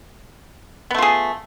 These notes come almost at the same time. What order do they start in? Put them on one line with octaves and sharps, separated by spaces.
B3 A3 F4 G#4